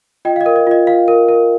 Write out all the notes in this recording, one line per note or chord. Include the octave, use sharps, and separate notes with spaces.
F4 D#5 G5
F5
D#5
A#4
D#5
F4 D#5
F4 F5
A#4
A#4